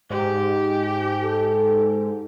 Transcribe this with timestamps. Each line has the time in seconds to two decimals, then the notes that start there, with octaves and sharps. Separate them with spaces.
0.10 G#2 G4
1.23 A4